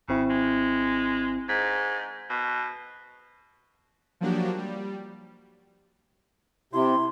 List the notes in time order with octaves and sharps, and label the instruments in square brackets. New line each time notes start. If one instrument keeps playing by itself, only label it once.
[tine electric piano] G#1 C4 E4 [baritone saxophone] C#3
[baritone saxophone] G#3
[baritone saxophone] G#2 [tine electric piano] B6
[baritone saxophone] B2
[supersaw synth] F3 F#3 A#3 D4 F#4 G4
G3
[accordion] C3 [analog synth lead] E4 [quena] C6